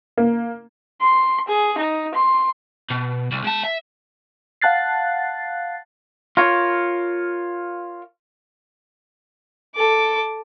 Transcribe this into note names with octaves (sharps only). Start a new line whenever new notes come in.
A#3
C6
G#4
D#4
C6
B2
C2
G#3 A5
E5
F5 F#5 A5 F#6 A6 C7
F4 A#4 C#5
A4 D6